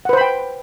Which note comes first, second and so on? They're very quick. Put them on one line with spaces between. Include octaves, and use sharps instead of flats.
F#5 B4 C5 B5 G5